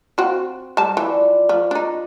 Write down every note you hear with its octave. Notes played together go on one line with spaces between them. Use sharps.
C4 F4 F#4
G3 A5
E3 F3 D5
F3 B5
D4 D#4